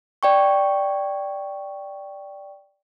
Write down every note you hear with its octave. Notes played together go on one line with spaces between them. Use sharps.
D5 G5 C#6